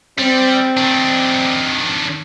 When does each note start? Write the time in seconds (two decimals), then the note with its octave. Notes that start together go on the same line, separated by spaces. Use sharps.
0.19 G3 C4
0.77 D#3 D4